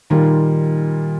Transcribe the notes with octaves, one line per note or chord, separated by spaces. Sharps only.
A#2 D#3 G3 A#3 F4 A#4